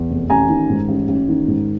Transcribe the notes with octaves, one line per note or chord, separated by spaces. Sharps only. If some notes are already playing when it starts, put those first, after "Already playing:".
Already playing: E2
F1
A1 G#5 A#5
D#3
G#2
A1
A1
D#3
G#2